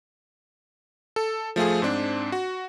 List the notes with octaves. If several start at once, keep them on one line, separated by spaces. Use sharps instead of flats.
A4
F3 A3 F4 G#4
G#2 C4 D4
F#4